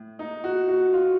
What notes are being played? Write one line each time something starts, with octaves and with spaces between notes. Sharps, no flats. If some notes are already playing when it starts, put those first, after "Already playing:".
Already playing: A2
D#4
F#4
F#4
F4